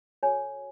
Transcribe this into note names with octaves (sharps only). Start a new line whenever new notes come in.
F#4 A4 C#5 G#5